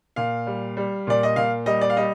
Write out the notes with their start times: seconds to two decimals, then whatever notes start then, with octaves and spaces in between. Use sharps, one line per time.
0.16 A#2 F5
0.47 G3
0.77 G3
1.07 A#2 D5
1.23 D#5
1.36 A#2 F5
1.66 G3 D#5
1.81 D5
1.90 F5
1.97 G3 D#5